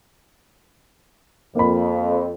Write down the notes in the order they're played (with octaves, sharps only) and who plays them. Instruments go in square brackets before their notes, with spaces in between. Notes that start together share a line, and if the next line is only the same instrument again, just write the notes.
[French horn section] F2 [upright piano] A#3 B5